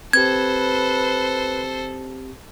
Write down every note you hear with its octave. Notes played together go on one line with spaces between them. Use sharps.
C4 G4 A4 B4 C5 G#6